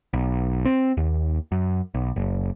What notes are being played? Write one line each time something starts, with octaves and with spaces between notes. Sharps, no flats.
B1
C4
D#2
F#2
B1
F#1